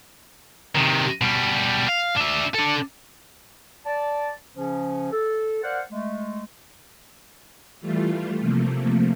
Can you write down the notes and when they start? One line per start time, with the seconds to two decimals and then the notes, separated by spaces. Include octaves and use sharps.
0.75 C3 D#3
1.21 B2 G3
1.88 F5
2.16 D4 E5
2.55 D4 A4
3.86 D5 A5
4.56 C#3 F3 C#4
5.12 A4
5.64 A#4 C5 D5 F5 F#5
5.91 G#3 A3
7.81 E3 G3 A3 F4
8.40 C3 F3 A3 A#3